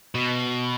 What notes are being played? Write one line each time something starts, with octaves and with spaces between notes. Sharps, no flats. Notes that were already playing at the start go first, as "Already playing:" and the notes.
B2